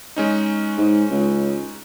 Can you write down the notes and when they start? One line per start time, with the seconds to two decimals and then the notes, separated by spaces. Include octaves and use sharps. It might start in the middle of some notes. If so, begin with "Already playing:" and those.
0.16 G#3 C#4 D#4
0.77 G#2
1.10 C#2